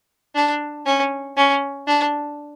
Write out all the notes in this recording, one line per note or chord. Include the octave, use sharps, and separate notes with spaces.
D4
C#4
C#4
D4